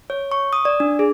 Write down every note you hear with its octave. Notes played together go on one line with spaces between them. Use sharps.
C#5
C#6
D#6
D5
D4
G#4